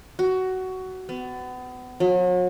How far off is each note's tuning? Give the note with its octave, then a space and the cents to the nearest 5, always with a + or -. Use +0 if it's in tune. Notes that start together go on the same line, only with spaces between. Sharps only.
F#4 +15
B3 +30
F#3 -40